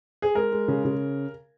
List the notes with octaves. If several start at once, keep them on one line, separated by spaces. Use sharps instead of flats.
G#4
G#3 A#4
G#3
C#3
C#3